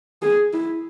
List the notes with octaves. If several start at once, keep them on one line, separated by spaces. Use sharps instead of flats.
G#4
E4